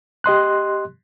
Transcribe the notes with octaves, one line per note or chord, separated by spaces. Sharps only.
G4 D#5 C6 F#6